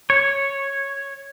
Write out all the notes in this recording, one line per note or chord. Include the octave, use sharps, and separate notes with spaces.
C#5